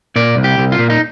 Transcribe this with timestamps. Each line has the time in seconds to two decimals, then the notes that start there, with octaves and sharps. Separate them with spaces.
0.16 A#2 D5
0.37 C2
0.44 G4
0.58 C2
0.72 F4
0.79 A#2
0.90 D#4